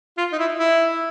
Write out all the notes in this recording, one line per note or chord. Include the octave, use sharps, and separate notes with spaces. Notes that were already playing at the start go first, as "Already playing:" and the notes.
F4
D#4
E4
E4